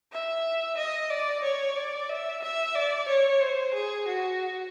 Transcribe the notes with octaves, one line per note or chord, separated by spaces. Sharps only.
E5
D#5
D5
C#5
D5
E5
E5
D5
C#5
C5
G#4
F#4